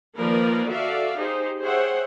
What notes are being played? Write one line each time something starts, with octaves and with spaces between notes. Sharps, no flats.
D#3 F3 A#3 A#4 B4 D5
F#4 A4 D5 E5 F5
D#4 G4 G#4 C5
G#4 C5 C#5 E5 F#5 G5